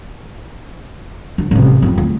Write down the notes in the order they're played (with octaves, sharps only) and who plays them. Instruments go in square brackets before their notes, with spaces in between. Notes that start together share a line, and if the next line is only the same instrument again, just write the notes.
[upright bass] D2
A1 C3
F2 C4
D2